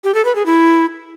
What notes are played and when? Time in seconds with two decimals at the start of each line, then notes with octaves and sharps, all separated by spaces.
0.04 G4
0.14 A4
0.25 B4
0.35 G#4
0.46 E4